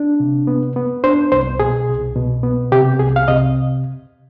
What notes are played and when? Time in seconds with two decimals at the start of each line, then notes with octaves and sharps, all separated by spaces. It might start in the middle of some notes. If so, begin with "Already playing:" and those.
Already playing: D4
0.20 C3
0.47 B3
0.76 B3
1.04 D4 C5
1.32 C2 C5
1.60 B2 G#4
1.88 C2
2.16 B2
2.43 B3
2.71 C3 G4
2.99 C2 G#4
3.16 F5
3.28 C3 D#5